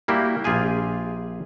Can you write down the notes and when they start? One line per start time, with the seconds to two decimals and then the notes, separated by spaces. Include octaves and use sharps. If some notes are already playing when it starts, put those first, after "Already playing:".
0.08 G3 A#3 E4 F#4 G4
0.44 A#1 F4 G4 G#4 G#5